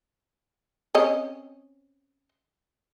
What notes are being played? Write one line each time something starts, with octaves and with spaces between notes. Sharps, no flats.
C4 C#4 D#5